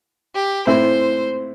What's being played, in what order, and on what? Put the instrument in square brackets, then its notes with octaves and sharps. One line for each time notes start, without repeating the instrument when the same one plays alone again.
[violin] G4
[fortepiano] A2 E3 C4 E4 [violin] C5